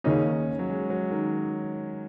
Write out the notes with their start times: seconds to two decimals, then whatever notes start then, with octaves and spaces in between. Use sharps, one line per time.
0.04 D#2 C#3 A#3 C#4 D#4
0.59 F#3
0.69 G#3
0.90 F#3
1.11 D#3